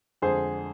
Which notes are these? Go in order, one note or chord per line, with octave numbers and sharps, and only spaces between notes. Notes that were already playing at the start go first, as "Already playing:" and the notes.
F2 D3 G#3 G#4 C5